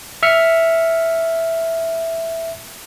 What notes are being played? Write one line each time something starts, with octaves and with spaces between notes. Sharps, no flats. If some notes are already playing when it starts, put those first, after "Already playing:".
E5 F6 C#7